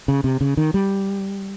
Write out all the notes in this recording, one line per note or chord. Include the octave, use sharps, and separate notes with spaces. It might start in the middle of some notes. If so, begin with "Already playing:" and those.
C#3
C3
C#3
D#3
G3